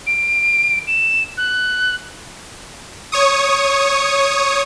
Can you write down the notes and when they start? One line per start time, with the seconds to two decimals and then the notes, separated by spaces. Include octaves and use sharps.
0.07 D7
0.88 E7
1.38 F#6
3.12 C#5 C#6 D#6